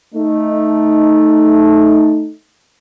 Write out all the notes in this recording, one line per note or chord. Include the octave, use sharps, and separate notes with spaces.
A3 D#4